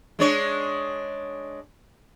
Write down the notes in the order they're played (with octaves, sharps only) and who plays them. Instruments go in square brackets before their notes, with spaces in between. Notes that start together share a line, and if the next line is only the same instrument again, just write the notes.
[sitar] G#3 D4 C#5